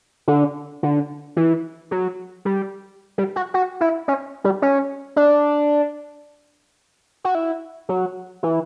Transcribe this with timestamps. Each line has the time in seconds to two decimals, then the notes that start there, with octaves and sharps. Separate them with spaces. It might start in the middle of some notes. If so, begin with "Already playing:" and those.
0.28 D3
0.83 D3
1.37 E3
1.91 F#3
2.45 G3
3.18 G3
3.36 F#4
3.54 F#4
3.81 E4
4.08 C#4
4.44 G3
4.62 C#4
5.16 D4
7.24 F#4
7.35 E4
7.89 F#3
8.43 E3